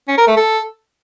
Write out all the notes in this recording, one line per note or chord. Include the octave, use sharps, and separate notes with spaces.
C#4
A#4
A3
A4